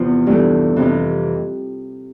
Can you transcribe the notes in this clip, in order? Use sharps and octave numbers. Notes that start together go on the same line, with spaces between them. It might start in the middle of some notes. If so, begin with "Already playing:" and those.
Already playing: E2 C3 F3 F4
G2 E3 A3
F2 C3 E3